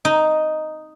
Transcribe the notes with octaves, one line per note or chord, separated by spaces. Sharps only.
D#4